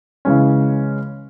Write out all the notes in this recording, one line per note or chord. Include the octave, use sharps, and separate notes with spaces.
C#3 E3 G#3 C#4